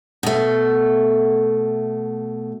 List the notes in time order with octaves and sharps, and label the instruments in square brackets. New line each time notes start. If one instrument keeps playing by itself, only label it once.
[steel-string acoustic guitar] B2 A3